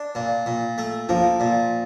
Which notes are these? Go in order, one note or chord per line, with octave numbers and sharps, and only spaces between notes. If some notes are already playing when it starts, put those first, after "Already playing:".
Already playing: D4
A#2
A#2
A3
F3 A#3
A#2